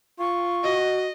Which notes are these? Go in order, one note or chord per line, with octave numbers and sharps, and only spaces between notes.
F4 C#6
F#4 D#5